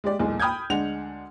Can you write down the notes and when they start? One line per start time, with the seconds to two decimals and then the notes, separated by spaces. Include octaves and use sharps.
0.04 G#3 G4 D5
0.19 B1 E2 A#2 G#3
0.40 G5 B5 D#6 F6 G6 G#6
0.70 D2 G#3 D4 F#5 F7